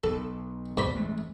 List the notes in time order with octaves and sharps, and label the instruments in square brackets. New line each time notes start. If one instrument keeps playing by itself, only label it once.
[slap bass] B1 [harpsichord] A4
[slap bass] B1 E2 [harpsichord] G2 C5 B5
[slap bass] A1 G#3 A3